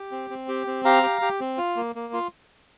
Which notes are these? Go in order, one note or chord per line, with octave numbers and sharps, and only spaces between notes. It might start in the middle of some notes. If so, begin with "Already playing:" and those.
Already playing: G4
C4
C4
G4
C4
G4 F5 A#5
G4
G4
C4
F4
A#3
A#3
F4